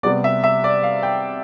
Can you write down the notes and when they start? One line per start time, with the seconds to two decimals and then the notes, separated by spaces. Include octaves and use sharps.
0.03 C3 G3 B3 D5
0.24 E5
0.44 E5
0.64 D5
0.83 F5
1.03 G5